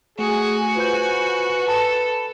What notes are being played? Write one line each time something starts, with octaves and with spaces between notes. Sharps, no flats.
A3 F#4 G#4 G#5
F4 B4 C5 G6
A4 A5